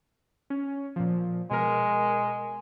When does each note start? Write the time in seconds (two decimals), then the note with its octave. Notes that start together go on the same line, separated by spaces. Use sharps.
0.50 C#4
0.96 A#2 F3
1.51 B2 G#3 A#4